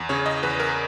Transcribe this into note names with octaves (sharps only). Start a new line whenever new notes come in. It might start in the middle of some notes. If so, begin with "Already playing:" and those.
Already playing: E2
C#3 C#5
D#5
E2 B4
A#4